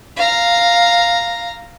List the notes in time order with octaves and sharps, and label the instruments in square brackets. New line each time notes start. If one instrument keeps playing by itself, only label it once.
[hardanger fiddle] F5 A#5